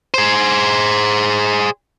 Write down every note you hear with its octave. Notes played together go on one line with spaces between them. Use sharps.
G#4 C5